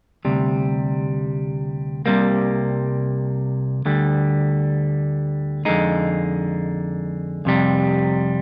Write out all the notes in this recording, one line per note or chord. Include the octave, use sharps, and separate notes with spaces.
D2 C3 G3
C2 C3 G3 A#3
D2 D3 G3
F2 D3 G#3 D#4
F2 C3 G3